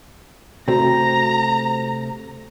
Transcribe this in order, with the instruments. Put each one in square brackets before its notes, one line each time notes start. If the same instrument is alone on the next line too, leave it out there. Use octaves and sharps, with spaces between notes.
[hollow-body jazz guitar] C3 A3 C4 [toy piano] F#4 [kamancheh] A#5